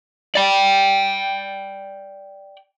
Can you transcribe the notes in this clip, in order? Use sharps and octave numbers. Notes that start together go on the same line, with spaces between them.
D5 G5